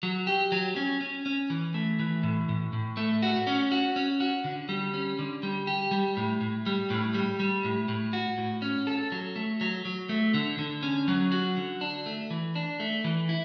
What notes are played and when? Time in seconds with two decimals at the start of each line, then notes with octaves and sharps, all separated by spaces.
0.03 F#3
0.27 G4
0.52 F#3
0.76 C#4
1.01 C#4
1.26 C#4
1.50 E3
1.74 A3
1.99 E3
2.23 A2
2.49 A2
2.73 A2
2.97 A3
3.22 F#4
3.47 C#4
3.72 F#4
3.96 C#4
4.20 F#4
4.44 D3
4.69 G3
4.94 C#4
5.19 D3
5.43 G3
5.67 G4
5.91 G3
6.17 A2
6.41 A2
6.66 G3
6.90 A2
7.14 G3
7.40 G3
7.64 A2
7.88 A2
8.13 F#4
8.38 A2
8.62 C#4
8.87 A4
9.12 F#3
9.36 A3
9.61 F#3
9.85 F#3
10.09 A3
10.34 D3
10.59 D3
10.83 C#4
11.08 F#3
11.32 F#4
11.57 D3
11.81 D4
12.06 A3
12.31 E3
12.56 D4
12.80 A3
13.04 E3
13.29 E4